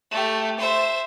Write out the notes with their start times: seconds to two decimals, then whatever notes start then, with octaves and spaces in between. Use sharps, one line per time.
0.11 A3 G4
0.58 C5 E5